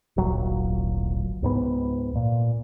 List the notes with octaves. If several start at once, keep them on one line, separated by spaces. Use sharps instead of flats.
D1 G#1 A#2 F#3
C#2 G#2 B3
A#2